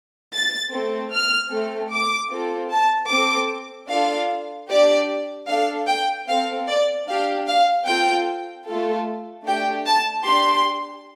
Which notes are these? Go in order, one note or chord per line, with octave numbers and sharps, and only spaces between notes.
A6
A3 C4 A4
F6
A3 C4 A4
D6
C4 F4 A4
A5
C4 A4 D6
D4 F4 A4 F5
D4 G4 D5
D4 A4 F5
G5
C4 A4 F5
D5
D4 G4 F5
F5
C4 F4 A4 G5
A3 F4 A4
A3 D4 G4 G5
A5
D4 G4 C6